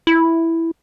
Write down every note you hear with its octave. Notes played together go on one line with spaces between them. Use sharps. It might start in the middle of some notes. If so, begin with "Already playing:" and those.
E4